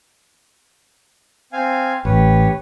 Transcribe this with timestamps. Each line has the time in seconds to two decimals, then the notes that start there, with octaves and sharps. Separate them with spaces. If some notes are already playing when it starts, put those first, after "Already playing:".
1.53 C4 F5 G#5
2.05 A1 G4 B4 C#5